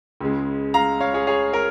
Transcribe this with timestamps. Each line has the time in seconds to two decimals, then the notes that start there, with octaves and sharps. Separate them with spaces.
0.21 C#2 C#3 G#3
0.74 F5 A#5
1.01 C#5 F5
1.14 G#4 C#5
1.27 G#4 C#5
1.53 A#4